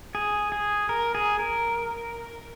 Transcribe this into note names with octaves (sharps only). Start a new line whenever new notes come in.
G#4
G#4
A#4
G#4
A#4